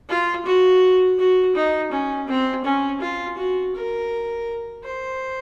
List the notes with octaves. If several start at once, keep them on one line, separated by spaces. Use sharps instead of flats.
F4
F#4
F#4
D#4
C#4
C4
C#4
F4
F#4
A#4
C5